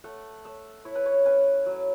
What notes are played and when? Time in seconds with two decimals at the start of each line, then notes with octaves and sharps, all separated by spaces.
0.04 A3 F#5
0.45 A3 E5
0.85 E4 C#5
0.95 B4
1.06 C#5
1.25 C#4 B4
1.66 F#3